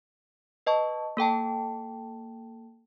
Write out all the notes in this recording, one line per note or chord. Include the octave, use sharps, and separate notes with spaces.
B4 D#5 A5 C#6
A#3 A4 G5 A5